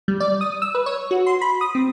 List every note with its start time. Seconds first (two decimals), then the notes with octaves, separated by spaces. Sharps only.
0.08 G3
0.20 D5
0.41 D#6
0.62 E6
0.75 B4
0.86 C#5
1.11 F#4
1.26 C6
1.41 B5
1.61 D#6
1.75 C4